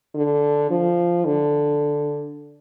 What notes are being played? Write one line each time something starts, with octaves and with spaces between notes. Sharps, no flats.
D3
F3
D3